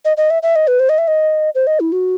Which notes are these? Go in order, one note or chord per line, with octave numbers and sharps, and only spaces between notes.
D#5
D#5
E5
E5
D#5
B4
C5
D#5
E5
D#5
C5
D#5
E4
F#4